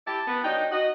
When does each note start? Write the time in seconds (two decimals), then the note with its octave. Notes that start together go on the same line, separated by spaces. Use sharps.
0.07 E4 G4 A5
0.28 B3
0.44 F#3 D4 D#4 G5
0.72 F#4 D#5